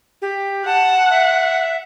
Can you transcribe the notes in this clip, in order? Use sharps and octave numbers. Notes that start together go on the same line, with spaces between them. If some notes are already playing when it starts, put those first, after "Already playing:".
G4
F#5 A5
E5